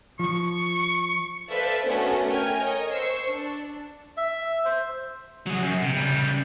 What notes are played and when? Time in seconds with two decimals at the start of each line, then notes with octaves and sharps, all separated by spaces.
0.19 F3 C#6
1.49 A4 B4 C5 D5 E5 F5
1.85 A3 B3 C#4 D4 F#4 A#4
2.27 A#4 G5 G#5 F6 G#6
2.62 A#4 C#5 D#5
2.92 C5 C#6 E6 C7
3.29 D4
4.17 E5
4.65 C5
5.46 F#3 G#4
5.62 F#2
5.82 C3
5.94 C#3 G3